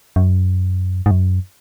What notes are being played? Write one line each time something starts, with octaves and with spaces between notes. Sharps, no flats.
F#2
G#2
F#2